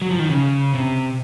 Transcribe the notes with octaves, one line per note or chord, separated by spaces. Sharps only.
F#3
F3
D#3
C#3
C3